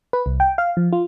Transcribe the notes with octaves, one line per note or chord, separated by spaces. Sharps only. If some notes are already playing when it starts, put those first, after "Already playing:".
B4
C2
G5
F5
F3
F4